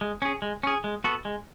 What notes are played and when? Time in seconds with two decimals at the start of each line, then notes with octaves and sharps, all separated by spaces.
0.01 G#3
0.22 C#4 G#4
0.42 G#3
0.63 C#4 G#4
0.84 G#3
1.04 B3 F#4 A4
1.25 G#3